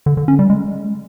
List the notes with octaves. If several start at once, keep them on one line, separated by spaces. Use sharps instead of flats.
D3
D3
C#4
G3
G#3